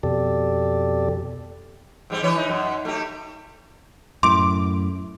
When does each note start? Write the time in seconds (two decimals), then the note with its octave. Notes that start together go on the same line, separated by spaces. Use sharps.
0.03 F2 B2 G4 A4 D5
2.10 G#2 G3 C4
2.23 E3 B4 C#5
2.37 D#4
2.49 F#2
2.85 A3 D#4 G4
4.23 F#2 A2 C6 D6